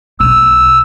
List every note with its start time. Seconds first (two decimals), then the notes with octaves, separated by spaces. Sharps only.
0.20 B1 E6